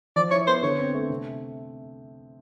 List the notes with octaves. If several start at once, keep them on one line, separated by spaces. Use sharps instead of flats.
F3 D5
E4 C#5
B3 C5
D3 C#5
C4
A3
C3